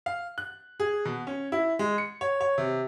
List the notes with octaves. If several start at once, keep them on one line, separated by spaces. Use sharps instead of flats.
F5
F#6
G#4
B2
C#4
E4
G#3
C#7
C#5
C#5
C3